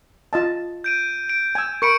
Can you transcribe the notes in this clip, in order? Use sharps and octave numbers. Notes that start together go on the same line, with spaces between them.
F4 D#5 A5
G6 D7 D#7
D7
G#5 E6
A#4 B5 C#6 C#7 D7